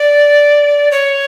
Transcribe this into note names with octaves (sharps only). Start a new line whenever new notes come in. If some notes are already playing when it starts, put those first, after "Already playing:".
Already playing: D5
C#5